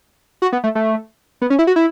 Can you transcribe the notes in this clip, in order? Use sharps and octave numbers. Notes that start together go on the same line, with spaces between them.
F#4
B3
A3
A3
B3
C#4
E4
F#4
E4